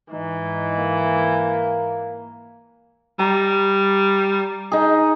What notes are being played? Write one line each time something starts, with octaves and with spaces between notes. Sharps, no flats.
G#2 E3 D#4
A#3
G3 A#5
D#4 G#4